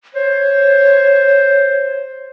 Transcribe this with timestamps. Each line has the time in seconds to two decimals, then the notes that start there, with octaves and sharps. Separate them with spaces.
0.15 C5 C#5